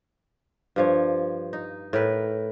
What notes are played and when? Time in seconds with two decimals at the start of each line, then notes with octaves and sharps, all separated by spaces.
0.76 G2 F3 C#5
1.53 D#4
1.93 A2 A#4 B4